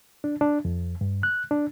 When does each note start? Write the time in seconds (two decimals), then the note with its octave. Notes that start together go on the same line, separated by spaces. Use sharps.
0.24 D4
0.41 D4
0.65 F2
1.01 G2
1.23 F#6
1.51 D4